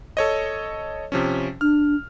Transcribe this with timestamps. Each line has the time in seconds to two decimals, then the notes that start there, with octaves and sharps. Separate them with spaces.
0.17 A4 C#5 D#5
1.12 C3 F3 C#4
1.61 D4 F6